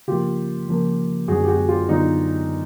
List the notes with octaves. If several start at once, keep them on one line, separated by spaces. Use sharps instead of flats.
C#3 F3 A#3 F4 G4
C#3 F3 A#3
F#2 D3 F#3 B3 D4 F#4 G#4
G4
F#4 G#4
F4 G4
D3 F#3 B3 D4 D#4 F4